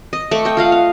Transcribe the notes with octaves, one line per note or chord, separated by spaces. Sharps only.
D#5
A3 C#6 D6
D#5 G5
F4 D#5 F5 F#5
F5